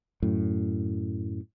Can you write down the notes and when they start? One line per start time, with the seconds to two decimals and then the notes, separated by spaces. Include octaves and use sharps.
0.22 F#2 A2